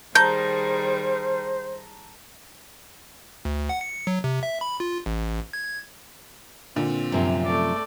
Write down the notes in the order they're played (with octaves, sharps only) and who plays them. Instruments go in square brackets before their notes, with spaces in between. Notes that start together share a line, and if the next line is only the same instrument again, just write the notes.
[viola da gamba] D#3 G3 G#4 [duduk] C5 [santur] A5 A#5 [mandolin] G6
[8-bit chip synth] D2
F#5
C#7
F#3
C3
E5
B5
F4
A1
G#6
[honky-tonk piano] A#2 D3 [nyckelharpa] C4
[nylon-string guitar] F#2 C3 F3
[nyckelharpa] A3 D5